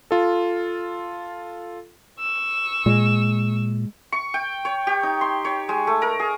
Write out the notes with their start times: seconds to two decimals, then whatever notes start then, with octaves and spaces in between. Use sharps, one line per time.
0.11 F4 A4
2.19 C#6 E6
2.86 A#2 G#3
4.12 C#6
4.34 G5
4.65 C#5
4.87 G4
5.03 D#4
5.21 C6
5.45 C#5
5.69 G#3
5.87 A3
6.02 A#4
6.20 G#4